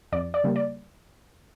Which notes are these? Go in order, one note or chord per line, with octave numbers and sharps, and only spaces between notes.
F2 D5
D5
C#3 G3 A#3
D5